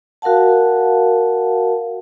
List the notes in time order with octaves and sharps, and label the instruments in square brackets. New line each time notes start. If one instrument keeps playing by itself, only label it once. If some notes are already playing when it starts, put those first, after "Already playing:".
[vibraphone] F#4 A#4 F5 F#5 A5